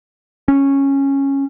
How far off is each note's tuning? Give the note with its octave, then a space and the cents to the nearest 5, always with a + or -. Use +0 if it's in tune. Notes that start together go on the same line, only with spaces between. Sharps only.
C#4 -10